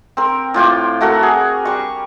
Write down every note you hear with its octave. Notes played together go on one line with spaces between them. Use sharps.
C4 A#4
A2 F4 G5 D6
A3 F#4 A4 A#4
G#4
G3 C#6